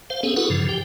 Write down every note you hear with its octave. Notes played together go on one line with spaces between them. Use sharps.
C5 F5
B3 C#4 G#4 A4
E4 F#4 G#4 A4 B4 F#5
G2 C#3 F3
G4 G5